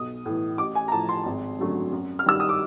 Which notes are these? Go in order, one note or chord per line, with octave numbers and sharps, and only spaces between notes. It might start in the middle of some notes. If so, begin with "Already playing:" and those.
Already playing: B1 D#6
A2 E3
A1 D6
G#5
A#5
A2 F3 A5
C6
G#1
F#2 D3 F#3 A3
F#2
F6
D#3 G3 E6
D#6
D6